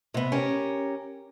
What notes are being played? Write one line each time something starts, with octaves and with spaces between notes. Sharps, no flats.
C3 B3
C#4 G4 A#4